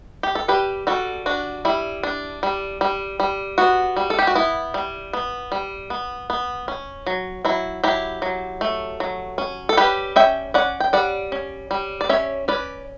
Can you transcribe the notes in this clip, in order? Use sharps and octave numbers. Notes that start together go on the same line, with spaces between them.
G4
A4
G3 G4 B4
G3 F#4 A4
D4 F#4
G3 E4
D4
G3
G3
G3
B3 F#4
G3
A4
G4
F#4
B3 E4
G3
B3
G3
B3
B3
C#4
F#3
F#3 E4
F#3 E4 G4
F#3
A3
F#3
C#4
A4
G3 G4 B4
C#4 E5 G5
C#4 D5 F#5
G5
G3 D5 F#5
C#4
G3
D5
C#4 C#5 E5
C#4 B4 D5